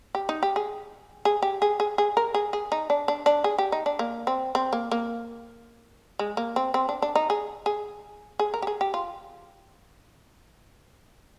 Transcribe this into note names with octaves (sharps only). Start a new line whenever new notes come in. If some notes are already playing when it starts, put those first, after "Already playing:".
G4
D#4
G4
G#4
G#4
G4
G#4
G#4
G#4
A#4
G#4
G#4
D#4
D4
D4
D4
G#4
G4
D#4
D4
A#3
C4
C4
A#3
A#3
G#3
A#3
C4
C4
D4
D4
D#4
G#4
G#4
G#4
A#4
G4
G#4
G4
F4